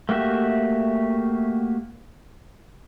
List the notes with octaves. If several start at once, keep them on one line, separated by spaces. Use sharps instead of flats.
A3 A#3 F#4 G4 E5